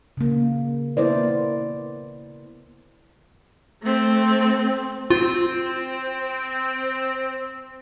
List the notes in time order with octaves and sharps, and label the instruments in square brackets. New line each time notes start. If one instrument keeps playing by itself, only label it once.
[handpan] C#3 A#3
A#3 B3 E4 A#4 C5 D5
[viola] A3 C4
[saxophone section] C4 [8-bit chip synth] F4